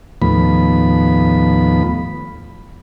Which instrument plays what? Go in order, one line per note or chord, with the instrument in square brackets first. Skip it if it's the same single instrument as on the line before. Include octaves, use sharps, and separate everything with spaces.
[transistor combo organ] D#2 A2 F3 B3 B5